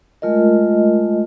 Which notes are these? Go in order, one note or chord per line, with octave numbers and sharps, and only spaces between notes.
G#3 A3 F4 A#4 D#5